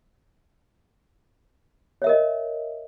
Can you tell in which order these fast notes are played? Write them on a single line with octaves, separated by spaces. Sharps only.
C#5 E5 A#4 D#5